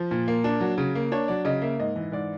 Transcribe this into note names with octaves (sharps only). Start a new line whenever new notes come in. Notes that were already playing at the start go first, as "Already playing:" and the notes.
Already playing: F3
A#2
A#3
D4
F#3
C#3
A#3
D4 C#5
F#3 D5
C#3 D#5
A#3 E5
G#2 D#5
E3
G#2 D5